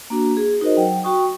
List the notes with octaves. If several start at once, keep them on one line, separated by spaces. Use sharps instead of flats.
A#3 D4 F#4
G#4
D#4 F#4 A#4 C5 D#5
F#3 G5
F#4 G5 C#6 D#6